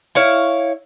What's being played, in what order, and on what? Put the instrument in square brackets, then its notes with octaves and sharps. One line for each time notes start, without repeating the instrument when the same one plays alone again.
[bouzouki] E4 C#5 F5